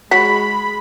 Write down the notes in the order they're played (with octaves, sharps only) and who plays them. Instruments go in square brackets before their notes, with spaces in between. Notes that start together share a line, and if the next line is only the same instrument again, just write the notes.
[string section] G#3 [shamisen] F#4 C#5 [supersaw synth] B5 [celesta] B6